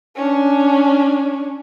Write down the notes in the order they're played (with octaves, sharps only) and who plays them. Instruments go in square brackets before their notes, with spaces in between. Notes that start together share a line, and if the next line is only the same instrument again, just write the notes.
[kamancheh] C#4 D4